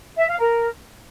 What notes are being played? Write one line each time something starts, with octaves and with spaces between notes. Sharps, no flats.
E5
F5
A#4